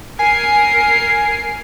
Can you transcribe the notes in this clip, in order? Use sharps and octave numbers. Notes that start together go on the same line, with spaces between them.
A#4 G#5 C7